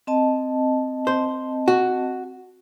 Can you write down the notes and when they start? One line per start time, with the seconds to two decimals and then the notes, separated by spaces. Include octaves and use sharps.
0.07 C4 D#5 A5
1.07 C5
1.68 F#4